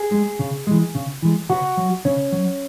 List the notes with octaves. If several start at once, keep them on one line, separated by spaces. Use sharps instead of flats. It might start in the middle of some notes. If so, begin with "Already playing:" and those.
Already playing: G#4
G#3
C#3
E3 G#3
C#3
E3 G#3
C#3 F#4 F#5
F#3
C#3 C#4 C#5
F#3